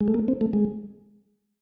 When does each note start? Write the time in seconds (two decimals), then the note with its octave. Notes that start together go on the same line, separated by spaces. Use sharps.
0.01 G#3
0.08 A3
0.14 A#3
0.28 C4
0.41 A3
0.53 G#3